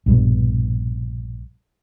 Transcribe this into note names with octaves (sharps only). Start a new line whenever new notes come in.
A#1 G2 B2